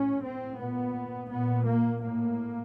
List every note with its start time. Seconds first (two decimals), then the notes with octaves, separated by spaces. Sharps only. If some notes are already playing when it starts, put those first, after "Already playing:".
Already playing: A2 C#4
0.24 C4
0.60 A#2 B3
1.31 A#2 B3
1.67 A#3
2.03 A2 A#3